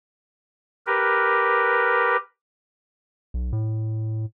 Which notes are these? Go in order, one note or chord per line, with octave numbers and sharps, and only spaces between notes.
G4 A#4 B4
B1
A2